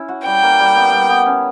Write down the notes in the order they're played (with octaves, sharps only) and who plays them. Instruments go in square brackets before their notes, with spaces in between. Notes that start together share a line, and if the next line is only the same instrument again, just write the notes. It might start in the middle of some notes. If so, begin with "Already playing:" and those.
Already playing: [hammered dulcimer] C#4 E4
F#4
[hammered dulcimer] G3 [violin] G5
[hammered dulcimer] A#3
G3
B3
G3
B3
C#4